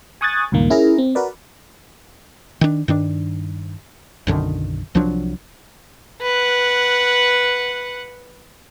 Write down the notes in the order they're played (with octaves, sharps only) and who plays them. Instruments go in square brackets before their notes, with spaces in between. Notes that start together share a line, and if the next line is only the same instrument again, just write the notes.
[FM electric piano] G#5 C#6 D#6 F#6 G#6 A6
C#2 G2 A#2 D#3 A#3
C#4 E4 G#4 A#4 A#5
C4
F#4 A#4 B4 D5
[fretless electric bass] D#3 D4
G2 D#3 D4
B1 F#2 D3 D#3
C2 F3 F#3 D4
[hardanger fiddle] B4 F#5